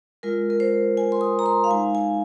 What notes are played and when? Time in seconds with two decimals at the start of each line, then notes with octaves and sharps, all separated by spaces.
0.23 G#3 F4 A#4
0.50 A#4
0.60 C5
0.97 G#5
1.12 C6
1.21 D#6
1.39 A#5
1.46 C6
1.64 F5
1.70 G#3 D#4 G#5
1.95 G#5